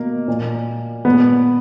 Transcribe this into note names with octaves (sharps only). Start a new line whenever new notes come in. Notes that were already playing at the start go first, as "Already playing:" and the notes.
Already playing: B2 A#3
A#2
A#2 B3